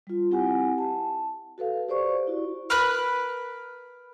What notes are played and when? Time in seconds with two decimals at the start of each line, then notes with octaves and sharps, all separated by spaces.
0.07 G3 F4
0.31 C4 E4 G4 F#5 G#5
0.78 A5
1.58 F#4 A4 B4 F5
1.89 G4 C5 D5 C#6
2.27 E4 F#4 D5
2.70 A#4 B4 B5 F#6